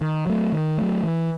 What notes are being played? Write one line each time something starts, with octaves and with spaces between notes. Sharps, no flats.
D#3
F#3 A3
D#3
F#3 A3
E3